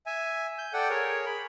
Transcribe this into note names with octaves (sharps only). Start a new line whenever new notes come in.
E5 G#5
G6
A4 D5 F#5 G5
G#4 A#4 C#5
G#4 B5